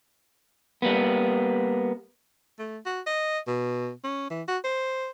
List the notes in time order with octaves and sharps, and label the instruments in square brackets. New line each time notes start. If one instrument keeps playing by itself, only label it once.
[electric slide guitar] G3 A#3 B3
[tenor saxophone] A3
F#4
D#5
B2
C#4
E3
F#4
C5